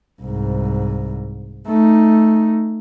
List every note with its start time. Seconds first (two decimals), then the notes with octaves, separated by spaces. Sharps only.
0.22 C2 G#2
1.67 A3 D#4